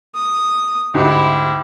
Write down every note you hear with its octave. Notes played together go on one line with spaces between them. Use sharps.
D#6
D2 G#2 E4 G4